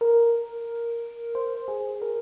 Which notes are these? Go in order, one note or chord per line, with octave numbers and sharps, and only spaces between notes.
A#4
C5
G#4
A#4